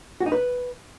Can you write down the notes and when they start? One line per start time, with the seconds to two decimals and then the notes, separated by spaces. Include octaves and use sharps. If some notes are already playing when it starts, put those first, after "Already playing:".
0.20 F#4
0.26 D#4
0.32 B4